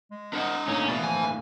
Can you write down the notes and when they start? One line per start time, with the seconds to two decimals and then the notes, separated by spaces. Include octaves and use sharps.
0.11 G#3
0.33 D4 A#4 C5 D#5 F#5
0.67 D2 A2 A#3 C#4 D#4
0.88 B2 E4 B4 D5
1.04 F3 G#5